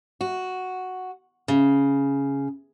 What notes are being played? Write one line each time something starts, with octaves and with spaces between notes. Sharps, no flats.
F#4
C#3